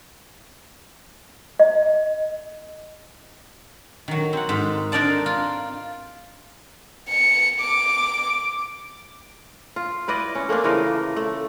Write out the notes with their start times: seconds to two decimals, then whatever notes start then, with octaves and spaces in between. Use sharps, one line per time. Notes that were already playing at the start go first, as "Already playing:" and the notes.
1.60 D#5
4.08 D#3 F#3
4.33 C4 F#5
4.49 G#2
4.92 D4 D#4 A#4 C5 D5 A5
5.26 F4
7.10 C#7
7.61 D6
9.76 F4
10.08 E4 B4 D5 D#5
10.35 C#4
10.49 A3 A#3 C4 D4
10.64 C#3 E3 F3 A#4
11.16 A3